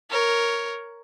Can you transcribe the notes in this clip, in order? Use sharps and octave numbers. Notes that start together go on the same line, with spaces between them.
A#4 C#5